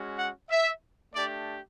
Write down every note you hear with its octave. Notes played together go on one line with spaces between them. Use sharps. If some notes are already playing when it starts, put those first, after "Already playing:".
Already playing: G#3 C#4 F#4
F#5
E5
A3 D4 G4 D5